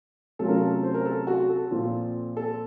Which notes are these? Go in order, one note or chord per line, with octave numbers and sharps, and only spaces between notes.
C3 F#3 A3 C#4 F4 A4
A#4
A4
C5
A#4
A4
F#4
A4
A#2 F3 C4 F4
A4